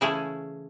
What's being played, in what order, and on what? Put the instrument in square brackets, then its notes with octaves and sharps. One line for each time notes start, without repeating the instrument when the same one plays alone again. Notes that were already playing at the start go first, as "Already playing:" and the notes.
[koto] C#3 E3 A3 C#4 E4 G#4